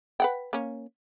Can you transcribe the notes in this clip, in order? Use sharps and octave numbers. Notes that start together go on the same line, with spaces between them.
B4 F#5 G5
A#3 C#4